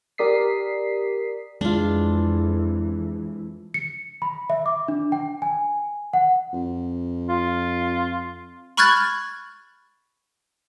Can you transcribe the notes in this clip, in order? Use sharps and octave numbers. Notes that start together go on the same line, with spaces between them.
G4 A#4 D5 D#6 B6 C7
F2 E3 G#3 D4 F4
C#7
B5
E5
D6
D4
G5
G#5
F#5
F2
F4
B5 C#6 F6 F#6 G#6 A6